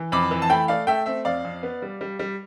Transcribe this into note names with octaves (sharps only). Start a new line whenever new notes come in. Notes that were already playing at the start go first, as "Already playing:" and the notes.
Already playing: E3
F2 B5 D6
E3
A5
A3 G5 B5
A3 D5 F5
A3 E5 G5
C4 E5
F2 D5 F5
F2
B3
G3
G3
G3